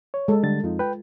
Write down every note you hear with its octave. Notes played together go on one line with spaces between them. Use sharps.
C#5
G#3 A4
D3 G3 A6
F2 D#4 F4
B4 G5